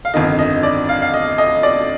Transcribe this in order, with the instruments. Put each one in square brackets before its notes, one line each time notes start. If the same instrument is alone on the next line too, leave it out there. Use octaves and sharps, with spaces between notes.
[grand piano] F5
G1 F2 D#3 D#5
D#5
D5
F5
F5
D#5
D#5
D5